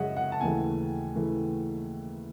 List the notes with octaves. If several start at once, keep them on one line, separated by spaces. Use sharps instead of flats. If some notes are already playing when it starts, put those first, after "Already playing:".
Already playing: F#2 C#3 G#3 C#5 D#5 E5 F#5
F#5
A5
D#2 C#3 E3 A3 G#5
C#3 E3 A3